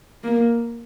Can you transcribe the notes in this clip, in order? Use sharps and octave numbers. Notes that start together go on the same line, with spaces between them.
A#3